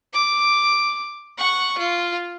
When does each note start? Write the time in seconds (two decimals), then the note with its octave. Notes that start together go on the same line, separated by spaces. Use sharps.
0.13 D6
1.38 F#5 C#6
1.78 F4